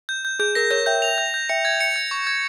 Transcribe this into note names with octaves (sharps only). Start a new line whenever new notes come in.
G6
G6
G#4 G6
A#4 A#6
A#4 C#5 G6
E5 G5 G6
F7
G6
G6
E5 G5 C#7
G#6
C#7
G#6
C#6
G#6